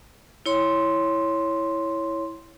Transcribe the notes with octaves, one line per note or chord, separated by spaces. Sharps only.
E4 C#5 C6